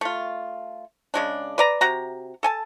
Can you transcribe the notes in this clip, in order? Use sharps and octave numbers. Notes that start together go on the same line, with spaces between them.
A3 F4
C#3 G#3 D4
B4 D5 A#5
C3 F#4 A#5
A4 G#5 A5